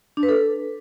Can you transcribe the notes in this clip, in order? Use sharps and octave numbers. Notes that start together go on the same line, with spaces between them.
D4
B4
A4